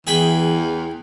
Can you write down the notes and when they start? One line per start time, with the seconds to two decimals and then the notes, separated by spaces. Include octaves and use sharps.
0.07 E2 E3 G#4 G5 B5